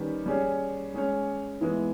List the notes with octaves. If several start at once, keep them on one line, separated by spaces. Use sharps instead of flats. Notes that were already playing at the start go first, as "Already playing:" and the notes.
Already playing: D#3 G3 C#4 G4 B4
G3 C#4 G#4 C#5
G#3 C#4 G#4 C#5
E3 G#3 B3